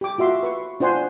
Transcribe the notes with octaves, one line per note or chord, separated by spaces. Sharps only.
G4 D6
F4 F#4 E5 C6
B4 C#6
D4 F4 C5 F#5 G#5 C6